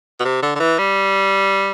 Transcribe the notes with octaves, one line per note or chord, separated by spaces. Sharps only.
B2
C3
D3
D3
E3
G3